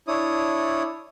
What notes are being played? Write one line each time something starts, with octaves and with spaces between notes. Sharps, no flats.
D4 E4 C#5 D#6